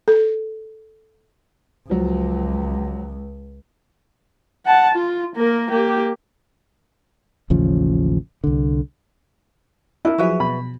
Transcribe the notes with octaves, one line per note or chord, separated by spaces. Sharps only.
A4
C#2 F3 F#3
F#5 A5
F4
A#3 A#4
A#3 G4
A1 D#2 C#3 F3
C2 D3
D4 E4 A#4
F3 F#3 F#4 G#4 B4 E5
B2 B5